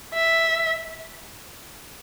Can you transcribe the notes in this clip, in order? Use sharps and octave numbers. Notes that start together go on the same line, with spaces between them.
E5